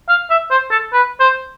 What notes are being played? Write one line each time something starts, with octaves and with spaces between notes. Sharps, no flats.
F5
E5
C5
A4
B4
C5